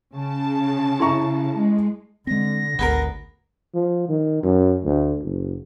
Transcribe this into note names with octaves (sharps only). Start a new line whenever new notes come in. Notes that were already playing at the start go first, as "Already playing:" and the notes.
C#3 A5
E4 A#5 C#6
G#3
D3 G#3 C4 A#6
G#1 D2 B3 G#4 A#4
F3
D#3
F#2
D2
F#1